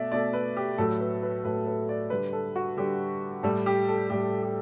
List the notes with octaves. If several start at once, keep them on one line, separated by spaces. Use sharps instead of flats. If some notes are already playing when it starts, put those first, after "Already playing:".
Already playing: B2 A3 D5 E5
B2 A3 D5
B4
G4
A2 F#3 A3 A4
B4
B4
A2 F#3 A3 B4
B4
D5
D3 G3 B4
A4
F#4
D3 G3 G4
A2 G3 A4
G4
A4
A2 G3 G4
G4